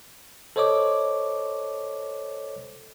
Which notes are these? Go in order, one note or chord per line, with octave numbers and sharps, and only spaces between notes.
A4 C5 C#5 D#5 D6